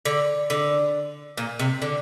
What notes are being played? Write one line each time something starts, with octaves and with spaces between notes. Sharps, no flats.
D3
D3
A#2
C3
D3